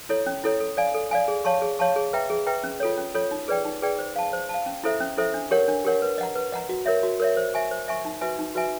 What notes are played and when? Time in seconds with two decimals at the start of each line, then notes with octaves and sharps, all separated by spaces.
0.09 E4 A4 C#5
0.26 C#4
0.44 E4 A4 C#5
0.60 A4
0.77 D5 F5 G#5
0.94 A4
1.11 D5 F5 G#5
1.28 G#4
1.45 C#5 F5 A5 C#6
1.62 G#4
1.79 C#5 F5 A5 C#6
1.96 G#4
2.13 B4 E5 G5 A#5
2.30 G#4
2.46 B4 E5 G5 A#5
2.64 C#4
2.80 F4 A4 C#5
2.97 C#4
3.15 F4 A4 C#5
3.31 D#4
3.48 G#4 B4 D5 G5
3.65 D#4
3.82 G#4 B4 D5 G5
3.99 C5
4.16 F5 A5
4.33 C5
4.49 A5
4.54 F5
4.66 C#4
4.84 E4 A4 C5 E5
5.00 C#4
5.17 E4 A4 C5 E5
5.34 D4
5.51 G4 A#4 C#5 F#5
5.68 D4
5.85 G4 A#4 C#5 F#5
6.02 B4
6.18 D#5 F#5 A#5
6.36 B4
6.52 D#5 F#5 A#5
6.69 F#4
6.86 A#4 C#5 E5
7.03 F#4
7.20 A#4 C#5 E5
7.37 C5
7.54 E5 G#5 C#6
7.71 C5
7.88 E5 G#5 C#6
8.05 D#4
8.21 F#4 B4 E5 G#5
8.39 D#4
8.55 F#4 B4 E5 G#5